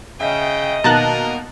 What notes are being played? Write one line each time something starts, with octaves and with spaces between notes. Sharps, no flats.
C#3 D#5 E5 G5
B2 D#3 A#3 B3 A#4 A5 A#5 F#6